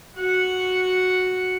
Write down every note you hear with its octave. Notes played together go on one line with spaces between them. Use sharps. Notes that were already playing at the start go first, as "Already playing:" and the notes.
F#4 F#5